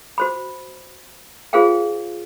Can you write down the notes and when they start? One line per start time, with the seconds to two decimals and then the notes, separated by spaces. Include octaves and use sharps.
0.18 F#4 C5 B5
1.53 F4 G#4 A#4 C5 F5 G5